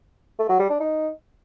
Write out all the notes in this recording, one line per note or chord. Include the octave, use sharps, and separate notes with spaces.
A3
F#3
G3
D4
D#4